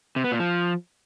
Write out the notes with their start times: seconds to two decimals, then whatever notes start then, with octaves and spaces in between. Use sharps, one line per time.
0.16 C3
0.24 B3
0.32 A#2
0.40 F3